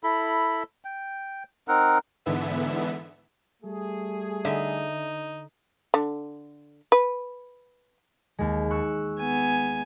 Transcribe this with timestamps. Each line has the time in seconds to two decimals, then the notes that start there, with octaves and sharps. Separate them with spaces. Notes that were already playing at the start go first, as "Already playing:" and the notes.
0.03 E4 A4 B5
0.85 G5
1.68 C4 D#4 A#4 F#5
2.26 G#2 D3 E3 B3 E5
3.63 G3 A3 G#4
4.45 D3 D#4 E5
5.94 D3
6.92 B4
8.38 D#2 G#3
8.70 C#6 E6 F#6
9.20 B3 G#5